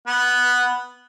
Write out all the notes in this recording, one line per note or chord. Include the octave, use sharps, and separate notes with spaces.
B3 F#5